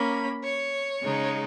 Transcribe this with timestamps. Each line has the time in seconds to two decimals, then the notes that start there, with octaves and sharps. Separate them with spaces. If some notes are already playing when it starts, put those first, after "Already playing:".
Already playing: A#3 C#4 B5
0.44 C#5
1.03 C#3 G#3 D#4